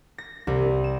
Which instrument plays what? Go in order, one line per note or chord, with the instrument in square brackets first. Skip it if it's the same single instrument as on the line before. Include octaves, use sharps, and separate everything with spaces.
[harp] A#6
C2
E7